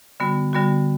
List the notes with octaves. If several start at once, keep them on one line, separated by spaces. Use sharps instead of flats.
D3 G3 B3 F#4
D3 G3 B3 F#4